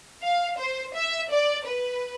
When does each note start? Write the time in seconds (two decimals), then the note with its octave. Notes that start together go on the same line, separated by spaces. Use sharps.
0.23 F5
0.59 C5
0.95 E5
1.32 D5
1.67 B4